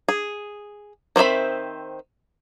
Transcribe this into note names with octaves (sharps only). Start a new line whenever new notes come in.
G#4
D#3 C4 C5 E5 B5